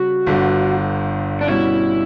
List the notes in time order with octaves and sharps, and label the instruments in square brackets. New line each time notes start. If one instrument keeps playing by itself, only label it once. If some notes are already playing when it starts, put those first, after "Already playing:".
Already playing: [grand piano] C#3 G3 [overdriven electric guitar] F#4
[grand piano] G1 G2 D3
[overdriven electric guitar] D4
[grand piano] B2 G3 C#4 F#4 [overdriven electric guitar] E4